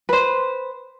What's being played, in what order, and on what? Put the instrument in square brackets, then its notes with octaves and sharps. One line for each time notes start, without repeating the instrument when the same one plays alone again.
[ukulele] B4 C5